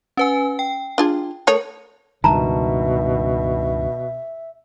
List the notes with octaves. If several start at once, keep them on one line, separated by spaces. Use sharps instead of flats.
C#4 B4 G#5
G5
D4 F4 G#4
A3 A#4 C#5
C#2 G2 B2 D#3 E5 A5 A#5